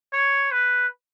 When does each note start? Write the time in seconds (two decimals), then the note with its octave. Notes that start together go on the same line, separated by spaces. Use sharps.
0.13 C#5
0.51 B4